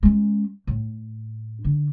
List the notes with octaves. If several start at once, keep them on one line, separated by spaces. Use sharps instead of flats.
G#3 C#4
A2
D3